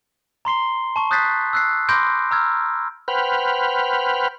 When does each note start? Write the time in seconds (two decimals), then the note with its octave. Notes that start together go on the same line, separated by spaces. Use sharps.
0.45 A#5 C6 C7 G7
0.96 A5 C#6
1.11 D#6 F#6 G6 A6 B6 C7
1.53 E6 F#6 C7
1.89 B5 C6 D6 G6 A#6 D7
2.31 A#5 E6 F6 G#6
3.08 B4 C5 F#5 G5 B5 F6